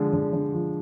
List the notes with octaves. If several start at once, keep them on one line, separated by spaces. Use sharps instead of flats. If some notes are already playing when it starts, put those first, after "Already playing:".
Already playing: D3 F3 G#3
D3
D3
F3